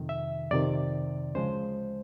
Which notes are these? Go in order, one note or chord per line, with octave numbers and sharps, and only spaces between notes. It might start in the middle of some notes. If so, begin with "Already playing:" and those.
Already playing: F2 C3 D#3
E5
F2 C3 D#3 D5
D2 C#3 F3 G#3 C5